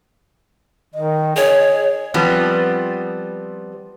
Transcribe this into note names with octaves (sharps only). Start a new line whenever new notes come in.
D#3 D#5
G#4 C#5
F3 G3 B3 C4